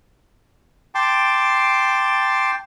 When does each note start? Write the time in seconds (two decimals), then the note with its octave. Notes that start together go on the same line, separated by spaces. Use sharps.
0.95 G5 A5 C6 D6